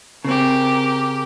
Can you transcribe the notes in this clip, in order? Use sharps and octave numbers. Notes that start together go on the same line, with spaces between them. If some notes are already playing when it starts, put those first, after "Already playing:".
C#3 C4 G4 A#4